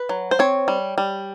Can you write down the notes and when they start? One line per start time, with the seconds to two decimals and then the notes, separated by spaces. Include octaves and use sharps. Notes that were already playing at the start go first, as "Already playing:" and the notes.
Already playing: B4
0.09 F#3
0.31 C5
0.39 C4 C#5
0.68 G3
0.98 G3